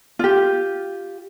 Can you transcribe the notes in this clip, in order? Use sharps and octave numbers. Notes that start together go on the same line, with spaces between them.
F4 G4